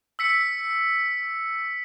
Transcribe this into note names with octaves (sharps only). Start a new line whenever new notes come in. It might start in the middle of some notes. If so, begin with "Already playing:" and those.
E6 B6 C#7